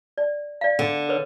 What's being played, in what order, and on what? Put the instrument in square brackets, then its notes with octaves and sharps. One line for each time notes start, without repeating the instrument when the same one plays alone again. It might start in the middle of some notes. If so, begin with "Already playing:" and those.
[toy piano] D5
D5 F5
[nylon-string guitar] D3
[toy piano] A#4 B4 C#5